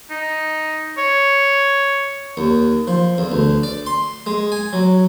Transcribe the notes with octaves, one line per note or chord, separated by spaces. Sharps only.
D#4
C#5
D#2
F3
E2
D2
D5
C6
G#3
G#5
F#3